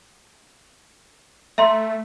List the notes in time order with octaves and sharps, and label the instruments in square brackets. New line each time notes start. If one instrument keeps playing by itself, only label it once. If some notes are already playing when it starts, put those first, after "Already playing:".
[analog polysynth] A3 [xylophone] E5 A#5 C6